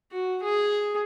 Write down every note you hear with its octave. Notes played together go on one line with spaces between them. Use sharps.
F#4
G#4